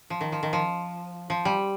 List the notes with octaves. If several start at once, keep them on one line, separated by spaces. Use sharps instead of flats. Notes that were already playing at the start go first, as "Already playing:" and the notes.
F3
D#3
F3
D#3
F3
F3
G3